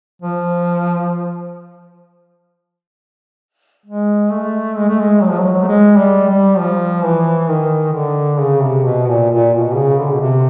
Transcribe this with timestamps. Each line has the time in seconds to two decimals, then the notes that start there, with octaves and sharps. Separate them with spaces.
0.22 F3
3.86 G#3
4.31 A3
4.77 G#3
4.88 A3
5.00 G#3
5.22 F#3
5.30 F3
5.40 F#3
5.63 A3
5.67 G#3
5.97 G3
6.28 G3
6.58 F3
7.03 E3
7.49 D#3
7.93 D3
8.39 C#3
8.62 C3
8.85 B2
9.08 A#2
9.30 A#2
9.53 B2
9.75 C#3
9.98 D3
10.14 B2
10.21 C3